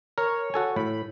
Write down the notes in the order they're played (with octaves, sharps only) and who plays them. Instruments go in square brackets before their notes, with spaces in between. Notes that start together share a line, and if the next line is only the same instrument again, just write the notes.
[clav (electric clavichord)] A#4 [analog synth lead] C#5
[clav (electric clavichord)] F#4 A4 G#5
[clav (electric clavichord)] A2 [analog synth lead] B5